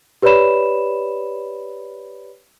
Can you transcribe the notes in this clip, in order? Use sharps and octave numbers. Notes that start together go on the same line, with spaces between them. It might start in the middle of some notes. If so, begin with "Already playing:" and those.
G4 B4 C#5 D5 B5 E7